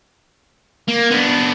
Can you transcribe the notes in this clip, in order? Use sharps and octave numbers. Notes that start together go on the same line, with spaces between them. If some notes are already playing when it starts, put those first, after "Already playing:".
A#3
B3 D4